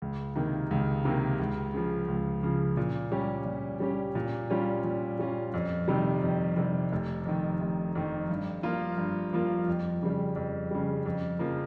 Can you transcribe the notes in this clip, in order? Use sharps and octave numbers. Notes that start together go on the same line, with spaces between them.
C#2
C3 D#3 A#3
C#2
C3 D#3 A#3
C#2
C#3 F3
C#2
C#3 F3
A#2
G3 C#4 G4
A#2
G3 C#4 G4
A#2
G3 C#4 F4
A#2
G3 C#4 F4
F2
C3 D#3 G3
F2
C3 D#3 G3
F1
F2 D#3
F1
F2 D#3
G2
F3 A#3 F4
G2
F3 A#3 F4
F2
C#3 G3
F2
C#3 G3
F2
C#3 F3 A#3